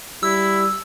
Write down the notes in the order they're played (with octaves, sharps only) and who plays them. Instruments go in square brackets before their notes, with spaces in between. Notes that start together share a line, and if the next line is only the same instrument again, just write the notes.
[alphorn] G3 [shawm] E4 [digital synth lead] E6